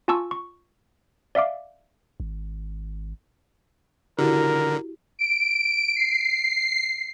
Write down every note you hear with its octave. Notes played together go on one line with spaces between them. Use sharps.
F4 G#5 A5 C#6 E6
C#6
D5 E5 F5 D6
G#1
D3 E4 F#4 G4 A#4
D7
C7